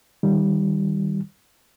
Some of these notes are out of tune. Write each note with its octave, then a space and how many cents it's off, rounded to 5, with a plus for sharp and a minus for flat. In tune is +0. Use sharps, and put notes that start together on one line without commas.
D#3 +0 G3 +0